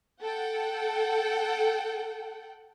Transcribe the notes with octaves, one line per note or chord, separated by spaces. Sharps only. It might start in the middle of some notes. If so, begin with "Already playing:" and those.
A4 F#5 G5